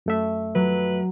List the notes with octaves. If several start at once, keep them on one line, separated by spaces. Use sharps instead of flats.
F#2 A3 E5
F#3 B4